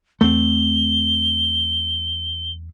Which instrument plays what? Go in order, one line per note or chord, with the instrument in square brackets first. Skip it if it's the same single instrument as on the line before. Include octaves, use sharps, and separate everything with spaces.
[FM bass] E2 [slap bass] A3 C4 [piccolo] G7